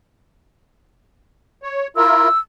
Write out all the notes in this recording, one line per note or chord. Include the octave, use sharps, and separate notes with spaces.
C#5
E4 F4 A#4 E6